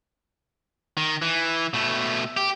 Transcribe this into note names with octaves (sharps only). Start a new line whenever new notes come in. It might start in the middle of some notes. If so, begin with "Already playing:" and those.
D#3
E3
B2 A3
G4